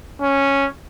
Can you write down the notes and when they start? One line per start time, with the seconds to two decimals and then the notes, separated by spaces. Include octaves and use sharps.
0.22 C#4